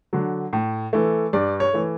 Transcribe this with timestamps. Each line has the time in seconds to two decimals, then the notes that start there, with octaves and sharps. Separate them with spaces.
0.13 D3 F#3
0.53 A2
0.93 E3 A3
1.33 G2 D5
1.60 C#5
1.73 E3 A3